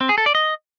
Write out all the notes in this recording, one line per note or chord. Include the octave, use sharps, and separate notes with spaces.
C4
G#4
A4
D5
D#5